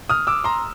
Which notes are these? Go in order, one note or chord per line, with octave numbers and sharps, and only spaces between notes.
D#6 F6
D6 E6
A#5 C6